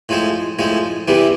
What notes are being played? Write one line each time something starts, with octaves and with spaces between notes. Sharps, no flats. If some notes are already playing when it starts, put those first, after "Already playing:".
A2 F3 G#3 C4
A2 F3 G#3 C4
E2 C3 E3 G3 B3